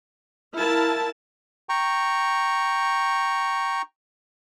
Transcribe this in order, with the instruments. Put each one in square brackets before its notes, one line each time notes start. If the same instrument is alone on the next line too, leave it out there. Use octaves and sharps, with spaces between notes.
[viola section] E4 A5 [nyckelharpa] A#4 F5
[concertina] G5 A#5 C#6